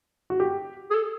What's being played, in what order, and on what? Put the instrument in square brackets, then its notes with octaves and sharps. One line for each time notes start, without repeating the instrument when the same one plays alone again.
[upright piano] F#4
G4
[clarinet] G#4
A4